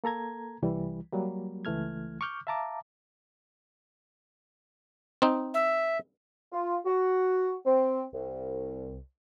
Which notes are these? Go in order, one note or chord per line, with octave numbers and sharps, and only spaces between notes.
A#3 A4 A#5 G#6
C2 E3 G3
F#3 G3 A#3
C#2 E3 A3 F6 G#6
C#6 D6 F6 G6
E5 F5 A5 A#5 D6
C4 D#4
E5
F4
F#4
C4
C2